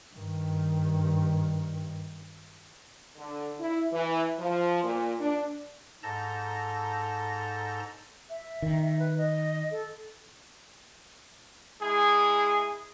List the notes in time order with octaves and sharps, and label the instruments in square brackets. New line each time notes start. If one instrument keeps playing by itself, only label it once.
[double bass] G2 D#3
[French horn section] D3
E4
E3
F3
A#2
D4
[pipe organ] G#2 A4 A5 A#5 G6 A#6
[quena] E5
[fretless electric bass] D#3
[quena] B4
D#5
A4
[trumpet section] G#3 E4 G#4